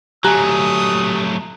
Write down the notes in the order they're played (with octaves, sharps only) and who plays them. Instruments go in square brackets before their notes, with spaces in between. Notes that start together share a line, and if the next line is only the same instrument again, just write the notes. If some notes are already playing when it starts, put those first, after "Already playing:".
[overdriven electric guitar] F#3 A3 [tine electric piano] G4 [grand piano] G#5 A#5 F#6 [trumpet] D#6